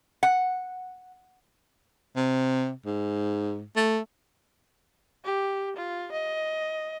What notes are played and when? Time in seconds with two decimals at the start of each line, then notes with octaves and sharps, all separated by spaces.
0.23 F#5
2.16 C3
2.85 G#2
3.76 A3
5.25 G4
5.77 F4
6.12 D#5